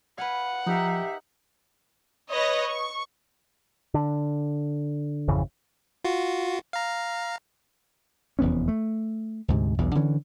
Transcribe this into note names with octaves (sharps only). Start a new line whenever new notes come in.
B4 F5 F#5 G#5
F3 D#4 G4 A#4 E5
B4 C#5 D#5 A#6
C#6
D3
G#1 F2 C#3 E3
F4 F#4
F5 A#5
F1 E2 B3 C#4
A3
D2 G#2 C3
B1 E2 G2 B2
D3 E3 C#4